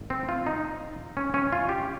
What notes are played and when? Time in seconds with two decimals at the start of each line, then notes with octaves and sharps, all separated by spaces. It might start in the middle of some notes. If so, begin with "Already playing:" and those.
Already playing: G#1
0.10 C4
0.29 F4
0.46 D#4
1.17 C#4
1.34 C#4
1.52 F4
1.69 G4